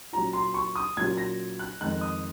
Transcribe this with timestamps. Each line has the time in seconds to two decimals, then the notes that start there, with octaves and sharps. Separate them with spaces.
0.13 A#2 F#3 C#4 F4 A#5
0.33 C6
0.54 C#6
0.76 D#6
0.97 A#2 F#3 C#4 F4 G#6
1.17 A#6
1.59 F#6
1.81 F2 D#3 G#3 D#4 F#6
2.01 D#6